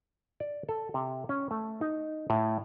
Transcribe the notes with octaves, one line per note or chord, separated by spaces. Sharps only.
D5
A4
C3
C#4
A3
D#4
A2